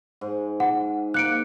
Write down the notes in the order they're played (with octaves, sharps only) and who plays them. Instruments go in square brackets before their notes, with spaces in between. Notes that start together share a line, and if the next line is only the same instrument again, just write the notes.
[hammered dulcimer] G#2
[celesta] F#5
[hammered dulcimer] A#3 [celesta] F#6 C#7 D7